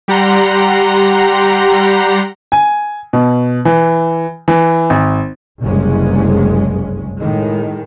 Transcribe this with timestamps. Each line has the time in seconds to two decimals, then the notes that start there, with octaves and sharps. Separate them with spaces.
0.08 G3 G4 F#5 A#5 C6
2.52 G#5
3.13 B2
3.65 E3
4.48 E3
4.90 G#1
5.62 F#1 C2 G2 G#3 C#4
7.19 A2 D#3 G#3